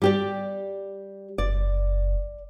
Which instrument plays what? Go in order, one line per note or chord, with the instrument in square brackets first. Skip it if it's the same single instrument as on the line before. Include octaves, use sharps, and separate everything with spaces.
[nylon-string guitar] G3 G4 D5
[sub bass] F#1 [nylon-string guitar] D5